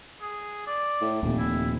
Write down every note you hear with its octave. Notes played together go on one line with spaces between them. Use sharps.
G#4
D5
A2
F1 D#2 A#2 A#3
E4